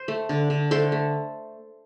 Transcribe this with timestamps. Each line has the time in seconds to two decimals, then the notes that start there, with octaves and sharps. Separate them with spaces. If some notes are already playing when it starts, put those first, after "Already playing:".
Already playing: C5
0.08 A3
0.29 D3
0.50 D3
0.71 A3 A4 C5
0.92 A3